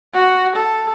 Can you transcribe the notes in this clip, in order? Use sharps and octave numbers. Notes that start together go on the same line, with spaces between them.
F#4
A4